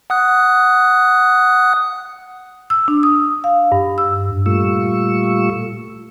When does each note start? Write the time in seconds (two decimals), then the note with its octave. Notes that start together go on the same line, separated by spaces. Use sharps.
0.10 F#5 D#6 F#6
2.70 E6
2.88 D4
3.03 D#6
3.44 F5
3.72 G2
3.98 E6
4.46 A#2 G3 A3 F4 C#6 E6